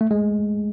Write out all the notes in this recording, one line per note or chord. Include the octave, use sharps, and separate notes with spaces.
A3
G#3